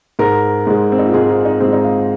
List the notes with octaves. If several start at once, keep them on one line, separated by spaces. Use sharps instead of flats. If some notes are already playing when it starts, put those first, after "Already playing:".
G#2 G#3 A#4
G#2 G#3
C4
D#4
F4
G#2 G#3 G#4
F4
D#4
G#2 G#3 C4
D#4
F5